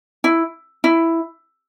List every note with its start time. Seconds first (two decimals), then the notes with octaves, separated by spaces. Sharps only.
0.24 E4
0.84 E4